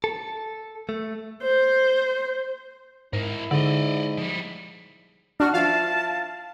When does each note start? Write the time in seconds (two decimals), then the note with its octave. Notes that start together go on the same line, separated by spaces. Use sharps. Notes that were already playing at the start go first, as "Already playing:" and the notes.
0.04 A4
0.89 A3
1.42 C5
3.13 G#2 G#3 E4 A#4
3.51 G#2 D3 D5 D#5
4.17 F3 G3
5.40 D4 F#4 F6
5.54 F3 E4 F5 A5